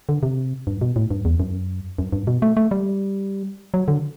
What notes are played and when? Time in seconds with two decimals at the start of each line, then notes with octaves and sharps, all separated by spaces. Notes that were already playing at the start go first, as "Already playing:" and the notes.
0.09 D3
0.23 C3
0.67 G2
0.81 B2
0.96 A2
1.11 G2
1.25 E2
1.40 F#2
1.98 F#2
2.12 G2
2.27 B2
2.42 A3
2.57 A3
2.71 G3
3.74 F#3
3.88 D3